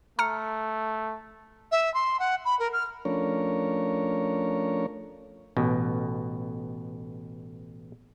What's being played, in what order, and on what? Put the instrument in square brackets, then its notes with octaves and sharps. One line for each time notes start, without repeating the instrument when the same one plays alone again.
[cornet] A3 [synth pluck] A#5 F6 C#7
[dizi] E5
C6
F#5
B5
A#4
F6
[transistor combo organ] F3 A3 C#4 D4 A#4 C#5
[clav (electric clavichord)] A1 B2